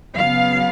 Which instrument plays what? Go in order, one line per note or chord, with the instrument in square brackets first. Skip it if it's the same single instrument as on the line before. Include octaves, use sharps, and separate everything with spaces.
[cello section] C#3 F#3 B3 F5